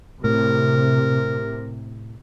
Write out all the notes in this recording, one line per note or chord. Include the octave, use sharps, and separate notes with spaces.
A2 C3 A#4